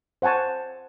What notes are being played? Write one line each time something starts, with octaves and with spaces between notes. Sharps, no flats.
C5 F#5 G#5 A5 C#6